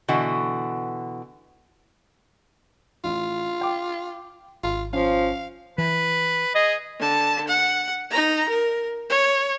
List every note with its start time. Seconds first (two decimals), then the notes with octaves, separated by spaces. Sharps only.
0.08 B2 D3 E3 F#4
3.04 A1 F4
3.61 G5 D6
4.64 G#1 F4
4.93 F3 C#4 F5
5.78 E3 B4
6.55 G#4 D#5
6.99 D3 A5
7.48 F#5
8.10 D#4 A#5
8.49 A#4
9.09 C#5